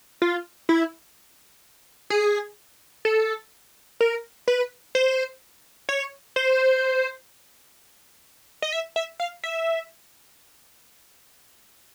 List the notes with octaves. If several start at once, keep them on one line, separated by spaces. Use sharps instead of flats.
F4
E4
G#4
A4
A#4
B4
C5
C#5
C5
D#5
E5
E5
F5
E5